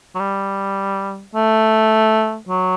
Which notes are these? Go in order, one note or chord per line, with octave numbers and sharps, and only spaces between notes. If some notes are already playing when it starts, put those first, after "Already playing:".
F#3
G3
A3
F#3